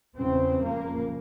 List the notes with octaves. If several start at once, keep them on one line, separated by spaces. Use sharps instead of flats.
E2 C#3 C4
F2 C#3 A#3